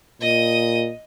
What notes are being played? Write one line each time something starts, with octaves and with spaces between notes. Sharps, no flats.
A#2 D#5 D#6